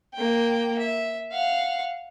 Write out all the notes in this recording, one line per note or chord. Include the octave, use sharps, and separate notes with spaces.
A#3 G5
E5
F5 F#5